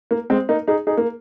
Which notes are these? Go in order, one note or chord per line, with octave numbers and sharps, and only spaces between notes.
A#3
G#3 C4
A#3 D#4
D#4 G#4
D#4 G#4
A#3